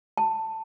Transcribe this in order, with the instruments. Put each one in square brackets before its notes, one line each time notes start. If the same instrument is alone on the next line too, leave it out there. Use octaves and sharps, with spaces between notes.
[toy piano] A5